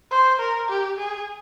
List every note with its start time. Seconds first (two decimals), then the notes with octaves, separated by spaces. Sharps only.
0.11 C5
0.40 A#4
0.69 G4
0.98 G#4